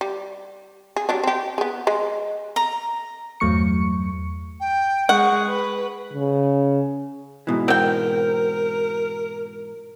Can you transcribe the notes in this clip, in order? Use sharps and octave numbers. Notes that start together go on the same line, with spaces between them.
G3
G#4
F#3 G3 D4
C4 G4
B3 G#4
G#3 G#4
A#5
E2 G2 F#3 A3 C#6 C#7
G5
G#3 F#5 C#6
B4
C#3
G#2 B2 E3
C4 A#4 G5